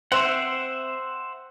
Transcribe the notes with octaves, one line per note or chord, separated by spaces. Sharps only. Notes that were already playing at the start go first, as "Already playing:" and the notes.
C4 C5 E5 F#5